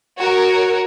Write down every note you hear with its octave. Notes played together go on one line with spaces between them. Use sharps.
F#4 A#4 C#5